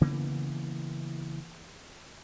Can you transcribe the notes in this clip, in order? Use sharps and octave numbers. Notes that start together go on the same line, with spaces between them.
C#3 E3 A#3 B3